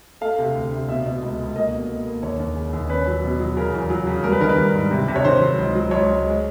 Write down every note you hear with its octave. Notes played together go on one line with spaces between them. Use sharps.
A3 F5
C3
D2
C3
B2 E5
B2
C#2
C#2
A#3 D#5
B2
A#3
A#3
D#2 C#5
D#2
C#3
D#2
C#4 B4
F#3
B2
F#3
C#3 A#4
E2
F#3
C#3
G3 A#4
B4
D#3 A#4
B4
G3
G#2
C3
C3
C#5
D#3 C5
F#3
C#2
F#3
C#2 C#5
C#2
G#3